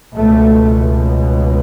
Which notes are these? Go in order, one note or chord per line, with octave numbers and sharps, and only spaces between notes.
C#2 B2 A3